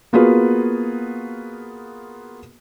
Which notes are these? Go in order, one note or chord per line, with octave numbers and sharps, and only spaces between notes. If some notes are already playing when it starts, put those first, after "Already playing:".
A#3 B3 F4 F#4 G#4 B4